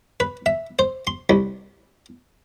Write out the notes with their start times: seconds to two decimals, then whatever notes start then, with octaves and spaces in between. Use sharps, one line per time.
0.20 B4
0.46 E5
0.79 C5
1.07 C6
1.30 C2